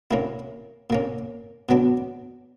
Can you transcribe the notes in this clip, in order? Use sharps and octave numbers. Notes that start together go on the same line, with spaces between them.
A#2 A#3 C#4 E4
A#2 A#3 C#4
B2 F#3 B3 D4